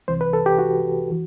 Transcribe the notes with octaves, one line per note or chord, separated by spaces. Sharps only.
C2 C3 E3 C5
B4
A4
G4
F#4
E3